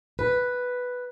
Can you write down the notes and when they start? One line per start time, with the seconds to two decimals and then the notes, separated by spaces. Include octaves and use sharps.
0.19 B4